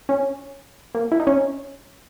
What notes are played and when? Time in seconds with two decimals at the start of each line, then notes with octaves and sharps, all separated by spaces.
0.09 C#4
0.95 A#3
1.12 E4
1.20 D#4
1.27 C#4